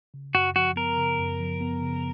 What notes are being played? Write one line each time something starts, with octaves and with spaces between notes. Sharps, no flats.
C#3
F#2 F#4
F3 F#4
B3 A#4
C#3
F#2
F3
B3
C#3